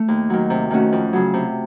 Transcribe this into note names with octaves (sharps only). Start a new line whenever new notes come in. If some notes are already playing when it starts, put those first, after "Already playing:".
Already playing: A3
D#2
D#3 F#3
C3
D#3 A3 C#4 F#4
F2
C#3 F#3
C3